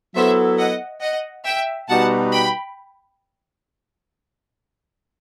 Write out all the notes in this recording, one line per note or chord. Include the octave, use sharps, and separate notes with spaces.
F#3 B3 E4 A4 C5 E5
D#5 F#5
D#5 F#5
E5 G5
B2 G3 D#4 F#4 B4 F#5 A5
G5 B5